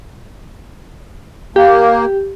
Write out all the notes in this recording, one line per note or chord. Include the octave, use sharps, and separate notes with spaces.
A#3 G4